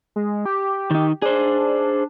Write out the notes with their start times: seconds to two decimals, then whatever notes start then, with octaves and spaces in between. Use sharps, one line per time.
0.16 G#3
0.46 G4
0.91 D#3 D#4
1.22 D4 G#4 C5